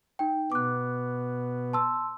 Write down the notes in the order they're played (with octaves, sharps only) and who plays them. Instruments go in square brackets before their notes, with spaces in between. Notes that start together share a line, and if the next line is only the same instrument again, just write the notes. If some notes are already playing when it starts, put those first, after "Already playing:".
[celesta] D#4 G5
[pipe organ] B2 B3 [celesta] D6 F#6
[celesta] A5 C6 E6